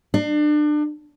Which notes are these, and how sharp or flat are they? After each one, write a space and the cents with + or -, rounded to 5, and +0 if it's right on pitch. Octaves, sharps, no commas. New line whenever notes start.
D4 +30